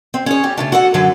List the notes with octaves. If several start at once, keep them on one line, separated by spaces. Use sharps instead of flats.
C4
C#4 G#4 C#5
G3 G4
C#3 A3 D4
F#4 A4 F#5
F#2 D3 F#3 F5